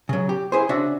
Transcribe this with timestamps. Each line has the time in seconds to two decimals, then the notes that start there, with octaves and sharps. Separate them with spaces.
0.09 C#3 F#3
0.29 G4
0.52 E4 G#4 C5
0.69 C#3 D4 F#4 E5